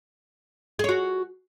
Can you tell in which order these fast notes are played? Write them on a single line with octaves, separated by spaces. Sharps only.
G#4 C#5 F#4